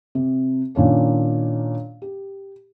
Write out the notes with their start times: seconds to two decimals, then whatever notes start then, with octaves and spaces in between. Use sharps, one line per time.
0.15 C3
0.75 A#2 D#3 C#4 D4
2.02 G4